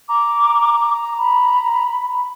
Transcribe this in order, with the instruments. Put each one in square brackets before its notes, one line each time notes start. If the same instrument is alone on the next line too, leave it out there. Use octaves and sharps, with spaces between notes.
[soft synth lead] A#5 [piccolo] D6
[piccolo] B5